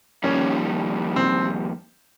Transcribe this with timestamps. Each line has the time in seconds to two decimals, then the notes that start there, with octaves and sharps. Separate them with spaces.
0.23 F2 D#3 G3 A#3 C#4
1.16 C4